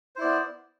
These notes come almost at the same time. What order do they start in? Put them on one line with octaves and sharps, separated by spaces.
C5 E4 D5 B3